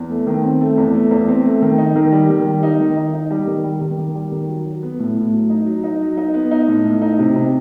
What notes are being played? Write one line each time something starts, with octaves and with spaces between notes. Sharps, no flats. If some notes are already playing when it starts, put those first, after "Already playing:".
Already playing: E2
A3
D#3
C4
A3
E2
A3
E2
C4
A3
D#3
D#4
D#3
G3
D#3
G3
D#4
D#3
D#4
D#4
G3
D#3
G3
D#3
D#3
G3
D#3
F#3
F#3
B3
A2
A2
F#3
D#4
F#3
D#4
F#3
D#4
B3
D#4
A2
A2
D#4
C3
C3